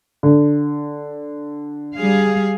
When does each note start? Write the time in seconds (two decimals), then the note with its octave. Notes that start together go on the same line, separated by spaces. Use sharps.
0.23 D3
1.96 G3 G#4 F5